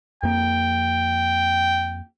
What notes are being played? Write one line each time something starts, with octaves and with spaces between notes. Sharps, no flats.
F2 A#3 G5